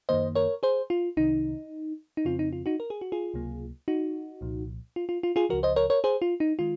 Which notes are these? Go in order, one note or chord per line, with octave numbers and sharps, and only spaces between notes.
F#2 D#3 A#3 C5 D#5
A#4 C#5
G#4 C5
F4
C2 C3 D#3 D#4
D#4
F2 C#3 F3 C4 F4
D#4
F4
D#4 F#4
A#4
G#4
F#4
F4 G#4
C#2 C3 F#3 A#3
D#4 F#4
C2 A#2 F3
F4
F4
F4
F4 G#4
C#2 C#3 F3 F#4 A#4
C5 D#5
A#4 C#5
A#4 C#5
G#4 C5
F4
D#4
D#3 G#3 F4